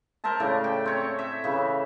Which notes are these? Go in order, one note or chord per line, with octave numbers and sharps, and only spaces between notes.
A#4 C5 E5 A5
A2 C#3 D5
G5
C4 C#5
E5
C#3 E3